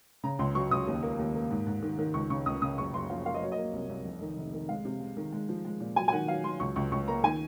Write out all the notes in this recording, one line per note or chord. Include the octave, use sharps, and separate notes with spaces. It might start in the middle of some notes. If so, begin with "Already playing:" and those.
C#3 A#5
C#2 C6
F#3 C#6
C#2 D#6
D#2
A#3
D#2
A#3
G#2
G#2
D#3
D#3
C#2 C#6
C#3 C#6
C#2 D#6
C#3 D#6
F#1 C#6
F#1 C6
F3 F5
A#3 F5
D#5
F#3 C#5
D#5
A#3
C2
C2
F1
D#3
F1
D#3
G#3 F5
C3
G#3
D#3
G#3
F3
G#3
A#2
F#3 G#5
G#5
D#3 F#5
F#3 F5
F#3 C6
C#2 C#6
C#2 C#6
C#2 C#6
A#3 A#5
D#3 G#5